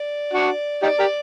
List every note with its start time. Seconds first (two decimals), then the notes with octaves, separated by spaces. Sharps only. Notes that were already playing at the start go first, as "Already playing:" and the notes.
Already playing: D5
0.34 D4 F#4
0.82 D#4 G4 D5
0.99 G4 A#4